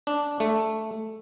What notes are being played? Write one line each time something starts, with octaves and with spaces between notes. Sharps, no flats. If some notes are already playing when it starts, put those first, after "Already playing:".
D4
A3